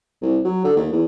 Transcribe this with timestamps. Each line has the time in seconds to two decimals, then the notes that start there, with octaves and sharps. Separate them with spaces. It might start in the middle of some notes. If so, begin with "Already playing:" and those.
0.22 C2
0.45 F#3
0.64 D3
0.76 D#2
0.92 E2